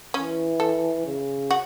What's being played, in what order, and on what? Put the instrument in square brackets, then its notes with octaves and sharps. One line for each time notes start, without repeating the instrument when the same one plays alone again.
[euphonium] E3 [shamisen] C#4
[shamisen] A4
[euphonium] C#3
[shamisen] F#4